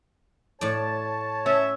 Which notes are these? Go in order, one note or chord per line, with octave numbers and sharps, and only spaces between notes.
A2 C#5 D5 A5
C#4 E5